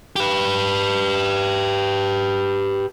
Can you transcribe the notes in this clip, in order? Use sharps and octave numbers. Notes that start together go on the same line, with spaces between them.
G4 B4